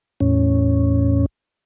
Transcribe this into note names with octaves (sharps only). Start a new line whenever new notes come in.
E2 A2 C#4